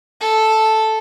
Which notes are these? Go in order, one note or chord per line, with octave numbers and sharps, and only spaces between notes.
A4